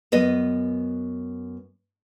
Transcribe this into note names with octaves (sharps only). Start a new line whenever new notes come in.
F#2 B3 D#5